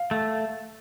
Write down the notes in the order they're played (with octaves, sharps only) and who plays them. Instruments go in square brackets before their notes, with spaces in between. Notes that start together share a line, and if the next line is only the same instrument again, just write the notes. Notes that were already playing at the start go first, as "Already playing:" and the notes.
Already playing: [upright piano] F5
[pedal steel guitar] A3